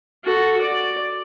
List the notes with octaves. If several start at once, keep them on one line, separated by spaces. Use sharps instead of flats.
F#4 A4
D5